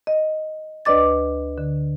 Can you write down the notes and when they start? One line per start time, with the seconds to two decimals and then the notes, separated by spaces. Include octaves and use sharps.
0.07 D#5
0.85 D2 B4 D5 D#5 D6 A6
1.58 D3